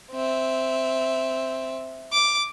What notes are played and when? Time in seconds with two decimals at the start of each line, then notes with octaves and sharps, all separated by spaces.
0.12 C4 E5
2.12 D6